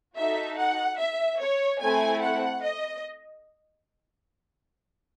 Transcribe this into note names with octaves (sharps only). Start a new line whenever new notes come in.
D#4 F#4 A4 E5
F#5
E5
C#5
A3 C4 E4 A4 G#5
F#5
D#5